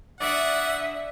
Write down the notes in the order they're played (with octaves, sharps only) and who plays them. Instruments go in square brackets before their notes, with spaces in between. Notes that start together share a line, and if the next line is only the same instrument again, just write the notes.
[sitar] D3 A3 D4 [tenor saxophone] D5 [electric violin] E5 D#6 [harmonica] F#5